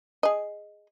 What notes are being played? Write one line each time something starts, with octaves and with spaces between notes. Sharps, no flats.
G#4 D#5